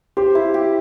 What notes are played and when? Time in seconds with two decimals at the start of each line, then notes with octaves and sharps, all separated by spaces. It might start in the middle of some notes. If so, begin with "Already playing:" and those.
0.17 G4 C5
0.35 E4
0.54 G4